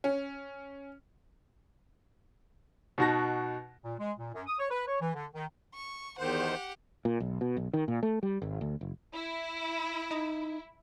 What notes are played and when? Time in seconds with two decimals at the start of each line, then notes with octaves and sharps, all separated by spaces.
0.04 C#4
2.98 B2 D#4 F#4 A5 A#6
3.84 A#2
3.99 G#3
4.18 A#2
4.35 F#2
4.47 D#6
4.59 C#5
4.71 B4
4.87 C#5
5.01 E3
5.14 D3
5.34 D#3
5.74 C#6
6.19 E2 D#3 G4 C5 F#5
7.05 A#2
7.20 B1
7.41 B2
7.57 B1
7.73 D#3
7.88 A#2
8.03 A3
8.23 G3
8.42 G#1
8.61 D2
8.81 F#1
9.15 E4
10.11 D#4